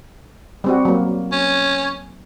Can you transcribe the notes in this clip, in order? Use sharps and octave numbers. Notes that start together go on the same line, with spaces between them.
G3 C4 F#4
F#3 A#3
C#4